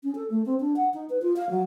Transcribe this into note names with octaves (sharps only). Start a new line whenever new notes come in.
C#4
A4
A3
C4
D4
F#5
D#4
B4
F4
F5
F#3